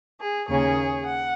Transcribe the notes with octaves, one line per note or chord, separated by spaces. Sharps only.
G#4
D#2 C#3 A#3 C#4 G#4 C#5
F#5